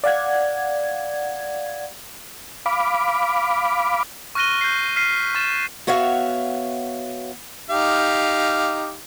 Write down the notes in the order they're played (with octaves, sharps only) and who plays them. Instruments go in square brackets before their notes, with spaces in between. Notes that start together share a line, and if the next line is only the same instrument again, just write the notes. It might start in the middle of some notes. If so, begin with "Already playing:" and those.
[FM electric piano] D5 F5 F#5 G#6
[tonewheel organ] F5 B5 D6
[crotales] C#6 F6 F#6 A#6 D#7 G7
G6 C7
F6 B6 C7 D#7
C#6 A6 E7
[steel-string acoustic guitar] B3 F#4 C#5 E5 F5
[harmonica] D#4 G4 F5